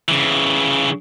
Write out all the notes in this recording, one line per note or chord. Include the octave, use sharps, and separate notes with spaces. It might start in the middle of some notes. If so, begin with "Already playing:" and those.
C#3 E3